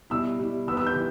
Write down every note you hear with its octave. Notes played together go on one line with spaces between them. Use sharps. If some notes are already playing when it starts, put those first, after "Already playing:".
B2 G3 E4 E6
B2 G3 E4
E3 B3 G4 B4 E6
E6
G6
E3